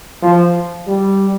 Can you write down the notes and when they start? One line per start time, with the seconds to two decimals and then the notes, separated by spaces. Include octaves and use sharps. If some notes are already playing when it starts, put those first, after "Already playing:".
0.22 F3
0.87 G3